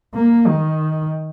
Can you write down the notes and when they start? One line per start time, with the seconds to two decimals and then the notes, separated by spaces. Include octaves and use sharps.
0.14 A#3
0.47 D#3